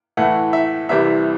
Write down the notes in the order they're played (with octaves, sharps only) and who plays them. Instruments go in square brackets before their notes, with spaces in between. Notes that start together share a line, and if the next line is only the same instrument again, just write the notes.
[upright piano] A2 E3 A3 F#5
E5
C2 C3 E3 G3 E5